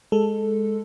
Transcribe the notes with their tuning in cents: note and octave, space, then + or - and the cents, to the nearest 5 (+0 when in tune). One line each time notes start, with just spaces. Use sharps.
G#3 +0 A4 +0